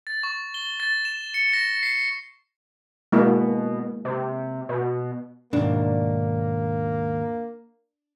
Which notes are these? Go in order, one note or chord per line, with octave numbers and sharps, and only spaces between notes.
A6
C#6
G7
A6
E7
C#7
A#6
C7
B2 G#3 A#3 E4
C3
B2
D#2 G#2 B2 A#3 D4